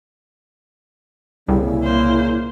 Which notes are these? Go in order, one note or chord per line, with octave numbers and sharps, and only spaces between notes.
C2 A#2 C#3 E4
A#3 C5